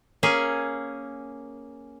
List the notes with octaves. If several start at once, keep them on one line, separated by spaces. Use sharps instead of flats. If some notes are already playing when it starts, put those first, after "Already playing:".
A#3 C#4 G#4